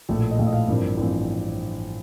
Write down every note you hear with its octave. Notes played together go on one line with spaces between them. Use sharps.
A#1 A2 A3
D#5
A#1 A2 A3 F5
D#5
F5
A1 G2 F3 C4 A#4
A1 G2 F3 C4